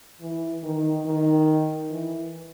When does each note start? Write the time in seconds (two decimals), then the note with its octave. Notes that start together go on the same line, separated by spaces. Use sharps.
0.21 E3
0.63 D#3
1.06 D#3
1.90 E3